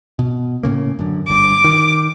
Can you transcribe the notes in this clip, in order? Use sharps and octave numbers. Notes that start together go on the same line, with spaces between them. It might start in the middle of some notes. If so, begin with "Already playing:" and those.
B2
A2 C#3 A#3
F#2 D3
G1 G2 D6
D#3